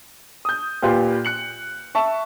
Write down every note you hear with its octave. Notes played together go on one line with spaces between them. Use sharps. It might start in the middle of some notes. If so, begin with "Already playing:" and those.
D#6 G6
A#2 F4 G4 B4 C6
F#6 C#7 F#7
E5 A5 C#6